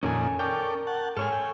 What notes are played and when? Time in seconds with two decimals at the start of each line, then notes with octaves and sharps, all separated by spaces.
0.03 F2 A#2 D#3 C#4 A4 G#5
0.39 C#4 A4 A#4 D5 G5
0.87 F#5 A5
1.17 G#2 A4 C#5 G#5 F6
1.32 G5